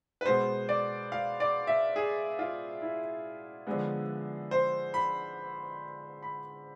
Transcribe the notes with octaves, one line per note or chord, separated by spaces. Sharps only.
B4
B2 G#3 B3 C5
D5
F5
D5
E5
G#4
F4
E4
D3 F3 G#3 B3
C5
B5
B5